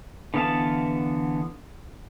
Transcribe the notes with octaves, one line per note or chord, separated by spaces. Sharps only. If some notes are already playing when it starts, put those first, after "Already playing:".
D3 E3 B3 F5 A5